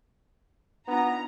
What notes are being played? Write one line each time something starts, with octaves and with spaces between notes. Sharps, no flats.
B3 D4 D#4 F4 A#5